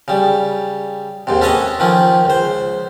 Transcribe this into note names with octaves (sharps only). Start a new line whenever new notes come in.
C#3 G3
D#2 G#2 C3
C#4 A4 B4 C#5 D#5
D#3 F3 C#4
C#2 C5